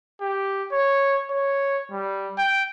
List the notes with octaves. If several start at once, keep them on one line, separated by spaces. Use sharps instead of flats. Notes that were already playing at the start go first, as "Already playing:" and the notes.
G4
C#5
C#5
G3
G5